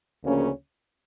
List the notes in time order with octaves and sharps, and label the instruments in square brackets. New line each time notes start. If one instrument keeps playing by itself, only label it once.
[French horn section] D2 C#3 F3 A#3 C#4